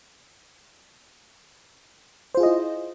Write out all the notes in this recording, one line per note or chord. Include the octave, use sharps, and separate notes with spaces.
E4 F4 G#4 C5 D#5